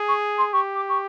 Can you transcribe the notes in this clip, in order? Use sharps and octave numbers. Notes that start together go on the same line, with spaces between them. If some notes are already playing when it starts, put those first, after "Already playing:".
Already playing: G#4
C#6
C6
G4 C#6
D6
C#6